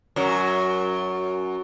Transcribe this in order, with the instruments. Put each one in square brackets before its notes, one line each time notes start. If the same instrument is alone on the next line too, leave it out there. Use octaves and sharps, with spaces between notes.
[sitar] F#2 F#3